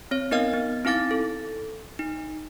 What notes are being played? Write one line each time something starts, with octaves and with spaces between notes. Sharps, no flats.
C4 C#5
B3 D#4 A#4 D#5 F5 F6
B3
C4 D#4 E4 F5 D6 A6
A4
D#4